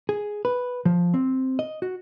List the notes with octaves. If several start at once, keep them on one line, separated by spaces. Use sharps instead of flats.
G#4
B4
F3
C4
D#5
F#4